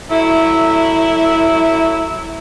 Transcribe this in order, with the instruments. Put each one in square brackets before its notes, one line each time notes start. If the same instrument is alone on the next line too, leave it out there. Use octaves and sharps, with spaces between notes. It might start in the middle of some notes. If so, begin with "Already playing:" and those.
[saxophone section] F#3 A3 E4